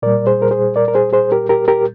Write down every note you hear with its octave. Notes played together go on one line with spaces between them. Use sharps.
A#2 G3 A#4 D5
G#4 C5
A#4
G#4 C5
A#4 D5
A#4
G#4 C5
G#4 C5
G4 A#4
G4 A#4
G4 A#4